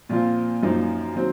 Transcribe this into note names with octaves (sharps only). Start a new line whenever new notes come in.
A#2 F3 C4 F4
F#2 F3 A#3 D#4
D#3 F#3 C4